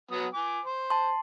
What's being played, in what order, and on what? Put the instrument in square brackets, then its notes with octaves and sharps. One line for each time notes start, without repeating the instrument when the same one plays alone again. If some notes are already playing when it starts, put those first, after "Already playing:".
[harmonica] F#3 B3 D#6
G#5 D6
C5
[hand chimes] A5 C6